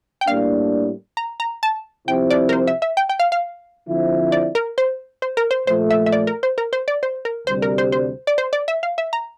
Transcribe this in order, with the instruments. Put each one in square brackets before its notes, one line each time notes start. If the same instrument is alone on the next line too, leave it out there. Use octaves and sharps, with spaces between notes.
[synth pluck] G5
[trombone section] A2 G3 A#3 D4 [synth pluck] F5
[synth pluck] A#5
A#5
A5
[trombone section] C2 C3 F3 C4 E4 [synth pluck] G5
[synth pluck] D5
A#4
C5
E5
E5
G5
G5
F5
F5
[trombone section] D3 F3 C4 E4
[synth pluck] D5
A#4
C5
C5
A#4
C5
[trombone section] A#2 F3 A3 [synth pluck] C5
[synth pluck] E5
E5
D5
A#4
C5
A#4
C5
D5
C5
A#4
[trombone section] D2 C3 G3 [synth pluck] C5
[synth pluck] A#4
C5
C5
D5
C5
D5
E5
F5
E5
A#5